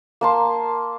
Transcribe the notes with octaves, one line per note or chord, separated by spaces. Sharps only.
A#3 A5 C6